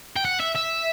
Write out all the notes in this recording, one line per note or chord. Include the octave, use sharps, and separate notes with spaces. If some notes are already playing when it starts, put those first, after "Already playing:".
G5
F#5
E5
E5